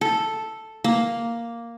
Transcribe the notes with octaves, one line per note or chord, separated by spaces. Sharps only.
A4
A#3